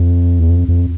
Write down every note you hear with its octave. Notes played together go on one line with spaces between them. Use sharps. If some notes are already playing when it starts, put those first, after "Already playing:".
Already playing: F2
E2
F2
F2